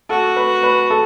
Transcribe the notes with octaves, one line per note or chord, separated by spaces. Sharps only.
F#4 A4
B4
B4
A4